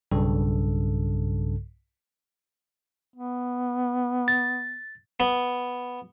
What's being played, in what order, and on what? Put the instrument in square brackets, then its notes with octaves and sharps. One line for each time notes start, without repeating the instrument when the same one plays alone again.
[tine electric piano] B1 G2 C#3 A4
[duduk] B3
[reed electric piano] A6
[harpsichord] B3